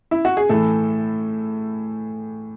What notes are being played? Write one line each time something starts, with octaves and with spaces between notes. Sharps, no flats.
E4
F#4
G#4
A2 E3 A4